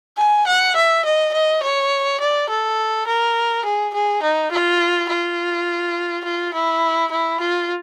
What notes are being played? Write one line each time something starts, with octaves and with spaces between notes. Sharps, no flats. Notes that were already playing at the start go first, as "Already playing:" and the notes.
G#5
F#5
E5
D#5
D#5
C#5
D5
A4
A#4
G#4
G#4
D#4
F4
F4
F4
E4
E4
F4